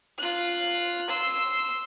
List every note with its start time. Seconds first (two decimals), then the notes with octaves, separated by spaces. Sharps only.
0.18 F4 F#6
1.09 C6 E6